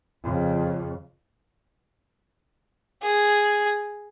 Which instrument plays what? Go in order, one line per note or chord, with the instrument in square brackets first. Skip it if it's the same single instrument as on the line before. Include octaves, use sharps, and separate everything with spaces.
[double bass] F2 C#3
[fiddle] G#4